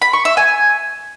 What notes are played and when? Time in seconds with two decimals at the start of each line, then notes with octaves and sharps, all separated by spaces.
0.02 B5
0.13 C#6
0.25 E5
0.37 G#5